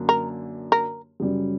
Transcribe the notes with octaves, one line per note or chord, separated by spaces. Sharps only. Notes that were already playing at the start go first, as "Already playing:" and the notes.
Already playing: F#2 D3 A#3 D4
A#4
A#4
F#2 C#3 G3 C#4